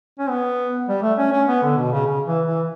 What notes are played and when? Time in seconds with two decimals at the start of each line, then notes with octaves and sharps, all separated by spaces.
0.19 C#4
0.30 B3
0.89 G3
1.03 A3
1.18 C#4
1.32 C#4
1.48 B3
1.63 D3
1.77 B2
1.92 C#3
2.06 C#3
2.26 E3
2.47 E3